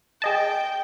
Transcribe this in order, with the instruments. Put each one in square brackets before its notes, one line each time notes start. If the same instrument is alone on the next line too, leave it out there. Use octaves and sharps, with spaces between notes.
[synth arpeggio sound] G#4 D#5 A5 [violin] G5